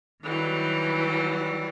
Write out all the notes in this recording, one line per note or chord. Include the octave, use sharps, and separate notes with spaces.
D#3 E3 F#3 G3